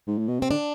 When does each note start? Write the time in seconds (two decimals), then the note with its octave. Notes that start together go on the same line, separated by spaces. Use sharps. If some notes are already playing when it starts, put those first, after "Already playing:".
0.07 G#2
0.18 A2
0.28 B2
0.40 C3 C4
0.50 D3 D4